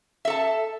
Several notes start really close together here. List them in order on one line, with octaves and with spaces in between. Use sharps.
E5 A4 A5